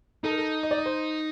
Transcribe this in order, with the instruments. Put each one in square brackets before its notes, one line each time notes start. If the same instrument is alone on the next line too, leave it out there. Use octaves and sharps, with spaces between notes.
[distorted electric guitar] D#4 [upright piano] A4
[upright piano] A#4
A4
D#5
D5
D#5
C5